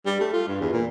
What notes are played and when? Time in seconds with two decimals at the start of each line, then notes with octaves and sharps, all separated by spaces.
0.06 G3
0.20 A3
0.33 F4
0.47 G2
0.61 E2
0.73 A#2